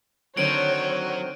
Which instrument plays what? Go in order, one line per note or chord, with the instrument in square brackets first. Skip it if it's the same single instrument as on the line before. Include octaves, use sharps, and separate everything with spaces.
[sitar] D3 D#3 C4 [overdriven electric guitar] F#3 [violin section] C#5 [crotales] D7 D#7